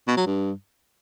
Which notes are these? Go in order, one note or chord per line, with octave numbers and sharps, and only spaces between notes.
B2
F#3
G2